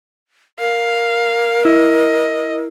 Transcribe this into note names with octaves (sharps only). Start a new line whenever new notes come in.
A#4 F5
E4 D#5